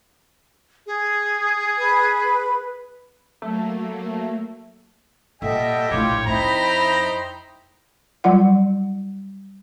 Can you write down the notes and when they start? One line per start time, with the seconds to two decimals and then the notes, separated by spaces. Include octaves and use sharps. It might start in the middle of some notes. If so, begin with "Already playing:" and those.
0.87 G#4
1.78 B4
3.42 F#3 A3 A#3
5.42 A#2 G3 A4 D#5 E5 F#5 G5
5.91 A#1 A2 F4 C#5 D6
6.26 F2 D#4 E4 C5 G5 A#5 B5
8.24 F#3 G3 F4 F#5